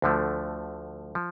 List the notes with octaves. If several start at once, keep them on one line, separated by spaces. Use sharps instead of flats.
D2 D3 F3 A3
F3